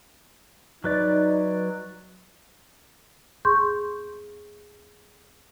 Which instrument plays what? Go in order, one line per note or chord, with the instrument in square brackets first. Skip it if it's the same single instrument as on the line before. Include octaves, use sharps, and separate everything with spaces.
[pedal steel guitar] F#3 B4 D5 [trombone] D#4
[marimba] G#4 C6 C#6 G6